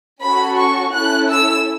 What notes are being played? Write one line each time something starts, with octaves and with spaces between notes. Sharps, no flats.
C#4 F#4 A4 B5
C#6
C#4 E4 A4 F#6
E6